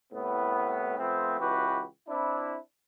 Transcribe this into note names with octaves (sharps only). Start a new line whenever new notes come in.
C2 A2 B3
F3 A3 B3 C4
C#2 E3 F#4 G4 B4
C4 D4 E4